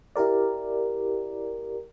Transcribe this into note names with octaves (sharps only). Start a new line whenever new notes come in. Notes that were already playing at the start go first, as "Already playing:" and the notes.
E4 G4 A#4 D5